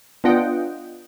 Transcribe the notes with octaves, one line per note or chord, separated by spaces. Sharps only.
B3 D4 F4 D#5 F#5 G5